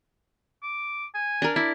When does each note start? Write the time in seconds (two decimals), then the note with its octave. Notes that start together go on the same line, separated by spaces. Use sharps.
0.63 D6
1.15 G#5
1.42 D4 A#4
1.56 E4 D5